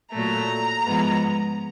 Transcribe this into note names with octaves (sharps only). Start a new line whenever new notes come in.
A#2 F#3 A3 A#5
G#2 F3 G#3 B3